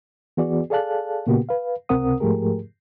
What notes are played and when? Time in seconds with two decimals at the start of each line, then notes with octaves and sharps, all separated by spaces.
0.37 E3 B3 F#4 G#4 D5
0.70 G#4 A4 D5 F5 A5 F#6
1.27 A#2 C#3 A#3 B3 F#4 G4
1.49 B4 F5
1.89 C#2 C3 C4 A#4 F#5 D#6
2.20 G#2 F3 A3 G4 G#4 A#4